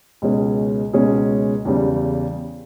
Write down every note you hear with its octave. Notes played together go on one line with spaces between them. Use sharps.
C#2 B2 G#3 C#4 G#4
C#2 B2 G#3 C#4 G#4
E2 C#3 G3